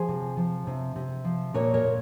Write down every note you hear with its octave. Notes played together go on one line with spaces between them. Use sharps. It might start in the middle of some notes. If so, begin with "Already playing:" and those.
Already playing: F3 G#4 C5
C3
F3
C3
C3
F3
A#2 A#4 C#5
A#4 C#5
A#2